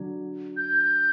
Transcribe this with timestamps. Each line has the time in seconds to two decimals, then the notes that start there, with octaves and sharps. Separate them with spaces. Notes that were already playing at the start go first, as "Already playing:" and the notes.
Already playing: D3 F#3
0.57 G6